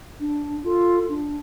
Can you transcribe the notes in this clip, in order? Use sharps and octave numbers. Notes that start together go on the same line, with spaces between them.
D4
F4 A4
D4